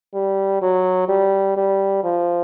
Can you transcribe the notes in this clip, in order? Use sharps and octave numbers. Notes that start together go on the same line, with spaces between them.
G3
F#3
G3
G3
F3